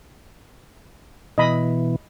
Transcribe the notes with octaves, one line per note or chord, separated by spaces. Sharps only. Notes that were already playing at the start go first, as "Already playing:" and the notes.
B2 E3 D#5 B5